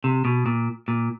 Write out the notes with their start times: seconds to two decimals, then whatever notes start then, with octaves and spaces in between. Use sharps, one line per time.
0.04 C3
0.25 B2
0.46 A#2
0.88 A#2